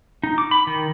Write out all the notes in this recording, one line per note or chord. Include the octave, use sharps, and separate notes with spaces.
D#4
D6
B5
D#3